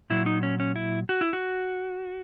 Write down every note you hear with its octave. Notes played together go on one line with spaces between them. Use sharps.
A#2 F#3 E4
D#4
C#4
C#4
E4
F#4
E4
F#4